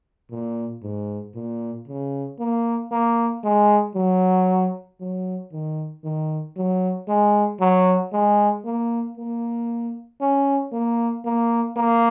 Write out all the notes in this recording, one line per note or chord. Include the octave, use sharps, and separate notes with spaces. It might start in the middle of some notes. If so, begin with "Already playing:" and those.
A#2
G#2
A#2
C#3
A#3
A#3
G#3
F#3
F#3
D#3
D#3
F#3
G#3
F#3
G#3
A#3
A#3
C#4
A#3
A#3
A#3